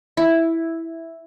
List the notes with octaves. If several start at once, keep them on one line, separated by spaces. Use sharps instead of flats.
E4